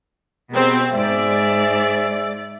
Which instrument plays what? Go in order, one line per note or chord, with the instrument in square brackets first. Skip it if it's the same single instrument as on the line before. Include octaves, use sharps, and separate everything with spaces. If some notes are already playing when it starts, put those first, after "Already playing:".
[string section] B2 C4 [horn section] G4 G#4 A#4
[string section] G#2 D5 [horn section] G#4 C5 E5